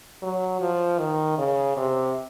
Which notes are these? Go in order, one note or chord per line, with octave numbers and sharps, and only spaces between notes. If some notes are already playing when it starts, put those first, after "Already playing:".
F#3
F3
D#3
C#3
C3